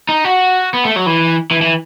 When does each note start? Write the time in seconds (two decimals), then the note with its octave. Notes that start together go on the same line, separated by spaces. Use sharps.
0.09 D#4
0.25 F#4
0.74 B3
0.85 A3
0.96 F#3
1.06 E3
1.51 E3
1.62 E3